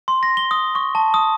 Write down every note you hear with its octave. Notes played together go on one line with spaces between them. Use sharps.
C6
A#6
G7
D#6
C#6
A5
D#6